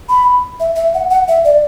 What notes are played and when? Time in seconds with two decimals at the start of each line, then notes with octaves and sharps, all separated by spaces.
0.09 B5
0.60 E5
0.76 E5
0.94 F#5
1.11 F#5
1.28 E5
1.45 D5